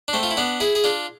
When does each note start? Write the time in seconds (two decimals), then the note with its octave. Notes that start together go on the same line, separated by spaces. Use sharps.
0.08 D4
0.13 A3 C4
0.23 F4
0.31 E4
0.37 B3 D4
0.60 E4 G#4
0.75 G#4
0.84 D4 F4